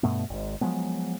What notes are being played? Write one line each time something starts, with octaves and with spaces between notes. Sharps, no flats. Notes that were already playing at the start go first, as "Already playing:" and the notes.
G2 B2 A3 B3
G#1 G#2
F3 F#3 G#3 B3